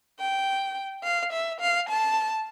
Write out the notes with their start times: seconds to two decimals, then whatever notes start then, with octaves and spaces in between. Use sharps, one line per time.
0.19 G5
1.03 F5
1.32 E5
1.60 F5
1.89 A5